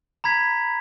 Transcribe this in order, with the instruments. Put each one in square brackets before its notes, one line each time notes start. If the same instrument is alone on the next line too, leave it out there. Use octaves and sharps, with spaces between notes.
[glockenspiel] A#5 B5 G#6 B6